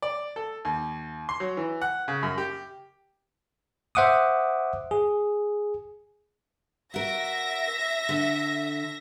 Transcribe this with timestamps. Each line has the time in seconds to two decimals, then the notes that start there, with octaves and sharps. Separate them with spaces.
0.02 D5
0.36 A4
0.65 D#2
1.29 C6
1.40 F#3
1.57 E3
1.82 F#5
2.08 C#3
2.23 F#2
2.38 G4
3.95 C5 E5 F#5 D6 D#6
4.91 G#4
6.94 F#4 A#4 E5 A#6
8.09 D3